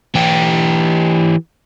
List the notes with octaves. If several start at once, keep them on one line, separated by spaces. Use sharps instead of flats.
E3 G4